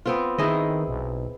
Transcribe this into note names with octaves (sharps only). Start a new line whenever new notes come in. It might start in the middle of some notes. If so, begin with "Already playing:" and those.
B3 C4 F4
D#3 E4 G#4 D#5
B1